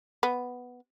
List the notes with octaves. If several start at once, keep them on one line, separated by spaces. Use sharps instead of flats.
B3